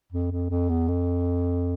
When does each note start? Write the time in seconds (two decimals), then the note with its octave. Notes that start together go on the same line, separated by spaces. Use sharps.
0.12 F2
0.31 F2
0.50 F2
0.69 E2
0.88 F2